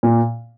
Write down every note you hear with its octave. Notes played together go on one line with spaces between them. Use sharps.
A#2